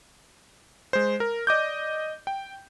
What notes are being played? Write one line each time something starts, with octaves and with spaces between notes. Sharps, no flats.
G#3 C5
A#4
D5 D#5 D6 G6
G5